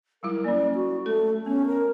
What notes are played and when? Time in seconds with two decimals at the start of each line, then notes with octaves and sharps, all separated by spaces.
0.23 F#3 G3 E4 A#4
0.44 A#3 C#4 D5
0.75 F#4
1.06 A3 A4
1.46 B3 C#4
1.66 A#4